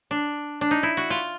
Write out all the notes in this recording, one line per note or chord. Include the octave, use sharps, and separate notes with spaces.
D4
D4
D#4
E4
F#4
F4